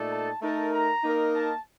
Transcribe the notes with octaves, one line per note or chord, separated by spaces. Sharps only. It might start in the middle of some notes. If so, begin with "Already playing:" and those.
Already playing: A#2 A3 D#4 A4 D5
A5
A3 D#4 A#4 A5
A#5
A#3 D#4 A#4 D#5
A5